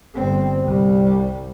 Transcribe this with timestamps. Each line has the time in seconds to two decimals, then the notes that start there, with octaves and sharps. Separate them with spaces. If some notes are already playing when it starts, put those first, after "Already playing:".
0.14 G1 C4
0.63 C2 G3